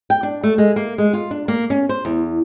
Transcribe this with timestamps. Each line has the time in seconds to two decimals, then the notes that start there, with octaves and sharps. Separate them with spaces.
0.10 G5
0.23 D4
0.43 A3
0.58 G#3
0.76 A#3
0.98 G#3
1.13 F4
1.31 D4
1.48 A#3
1.70 C#4
1.89 C5
2.05 E2